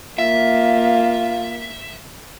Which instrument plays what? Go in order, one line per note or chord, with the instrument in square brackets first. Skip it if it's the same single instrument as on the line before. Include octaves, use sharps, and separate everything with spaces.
[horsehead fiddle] A#3 [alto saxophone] F4 [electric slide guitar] E5